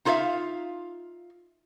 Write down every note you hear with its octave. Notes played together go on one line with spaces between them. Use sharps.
D#4 F4 A4 C#5 E5 F5